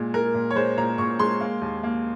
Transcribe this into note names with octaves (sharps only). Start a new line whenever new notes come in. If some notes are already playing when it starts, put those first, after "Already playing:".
Already playing: A#2 G#3
G#3 A#4
A#2
C#5
G#3 C5
A#2 A#5
A#2 C#6
G#3 C6
A#3
D#2
A#3